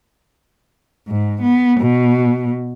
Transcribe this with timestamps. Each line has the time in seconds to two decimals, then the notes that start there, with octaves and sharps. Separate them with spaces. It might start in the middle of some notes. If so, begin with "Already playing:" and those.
1.08 G#2
1.42 B3
1.80 B2